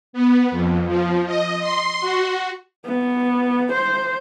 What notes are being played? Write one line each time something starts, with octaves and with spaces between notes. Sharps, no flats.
B3
F2
F3
D#5
C6
F#4
B3
C5